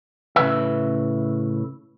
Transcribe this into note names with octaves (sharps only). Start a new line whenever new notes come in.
A2 C#3 F3 B4 E5